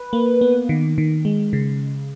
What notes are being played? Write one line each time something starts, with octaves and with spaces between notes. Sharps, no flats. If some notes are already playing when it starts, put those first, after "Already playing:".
Already playing: B4
A#3
B3
D#3
D#3
G#3
C#3